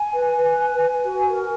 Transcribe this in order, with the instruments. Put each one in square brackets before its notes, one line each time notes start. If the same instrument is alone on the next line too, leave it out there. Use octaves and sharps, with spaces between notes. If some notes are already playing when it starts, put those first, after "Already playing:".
Already playing: [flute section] G#5
B4
B4
G#5
G#5
F#4
A#4